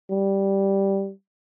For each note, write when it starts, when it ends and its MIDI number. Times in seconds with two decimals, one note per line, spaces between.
0.10 1.11 55